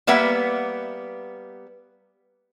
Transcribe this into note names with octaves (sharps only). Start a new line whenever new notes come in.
G3 A#3 B3 B4 E5 F#5